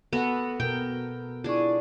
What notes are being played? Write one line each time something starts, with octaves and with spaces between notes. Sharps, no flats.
B3 F#4 A4 F#5
B2 A#4 G5
D4 E4 F4 G#4 D5 C#6